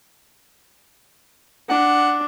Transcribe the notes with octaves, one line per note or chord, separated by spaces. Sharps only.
D4 F#5